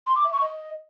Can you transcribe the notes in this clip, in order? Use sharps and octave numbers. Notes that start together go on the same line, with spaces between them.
C6
D6
E5
C#6
D#5